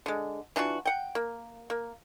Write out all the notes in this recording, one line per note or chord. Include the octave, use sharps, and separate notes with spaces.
D3 G#3
E3 D4 F4 F#4
F#5 G5
A#3
A#3